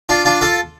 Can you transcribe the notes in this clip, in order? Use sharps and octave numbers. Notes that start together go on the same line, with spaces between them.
D4 F4
D4 F4
F4 A4